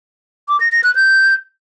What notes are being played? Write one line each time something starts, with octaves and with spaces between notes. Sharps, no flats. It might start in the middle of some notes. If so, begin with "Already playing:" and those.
D6
A#6
A#6
F#6
G6